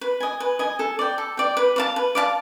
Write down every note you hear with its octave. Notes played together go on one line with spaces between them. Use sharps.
B4
D#5 G#5
B4
D#5 G#5
A4
D5 G5
A4
D5 G5
B4
D5 F5 A5
B4
D5 F5 A5